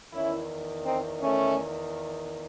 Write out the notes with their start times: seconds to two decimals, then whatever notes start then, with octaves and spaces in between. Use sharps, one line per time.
0.12 E2 D#3 C#4 E4
0.85 C4 D#4
1.22 A3 C#4